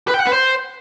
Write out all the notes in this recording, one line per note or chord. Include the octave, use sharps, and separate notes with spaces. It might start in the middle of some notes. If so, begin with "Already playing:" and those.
B4
G5
F#5
B4
C5